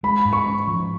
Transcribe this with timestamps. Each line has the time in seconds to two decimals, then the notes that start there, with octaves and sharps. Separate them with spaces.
0.03 G#3 B5
0.25 G#2
0.33 C#6
0.47 C#4
0.67 F3